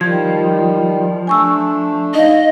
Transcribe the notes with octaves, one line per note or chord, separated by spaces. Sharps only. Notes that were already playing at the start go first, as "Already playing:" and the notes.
D#3 F3 G3 G#6
A3 D4 G#5 C#6 E6
D#4 D#5 F5